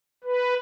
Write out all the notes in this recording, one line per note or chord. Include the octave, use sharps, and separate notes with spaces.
B4